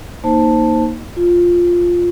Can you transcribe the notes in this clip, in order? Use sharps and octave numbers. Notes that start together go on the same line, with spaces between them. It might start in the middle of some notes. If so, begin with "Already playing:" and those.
A#3 D#4 C5 A5
F4